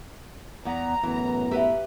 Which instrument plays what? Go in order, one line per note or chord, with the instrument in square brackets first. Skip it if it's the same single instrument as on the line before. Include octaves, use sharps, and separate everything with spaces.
[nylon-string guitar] E2 B3 [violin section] A#5
[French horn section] F#2 A2 B3 [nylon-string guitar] E3
[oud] E4 [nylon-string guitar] G4 B4 F#5